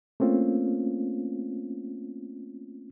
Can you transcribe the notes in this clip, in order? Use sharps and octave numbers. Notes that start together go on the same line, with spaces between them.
A3 A#3 C4 C#4 F4